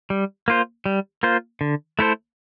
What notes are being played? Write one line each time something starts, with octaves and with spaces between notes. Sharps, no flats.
G3
A#3 F4 C5
G3
A#3 F4 C5
D3
A3 E4 A4 C5